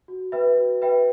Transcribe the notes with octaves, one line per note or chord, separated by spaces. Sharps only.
F#4
B4 E5 G5 B5
F#4
B4 E5 G5 B5